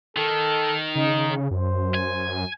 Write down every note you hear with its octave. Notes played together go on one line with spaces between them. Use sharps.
D#3 A4
C#3 D#4
F#2 C5
G#5